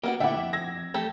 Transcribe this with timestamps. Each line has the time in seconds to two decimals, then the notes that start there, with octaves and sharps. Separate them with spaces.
0.03 A#3 B3 F#4 G4
0.20 A#2 D3 A3 E4 G4 E5 F#5 D6
0.37 F2
0.53 E6 G#6 A#6
0.94 A3 G4 A4